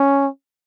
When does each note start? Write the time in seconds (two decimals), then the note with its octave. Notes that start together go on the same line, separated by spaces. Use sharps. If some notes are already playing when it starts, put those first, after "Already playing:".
Already playing: C#4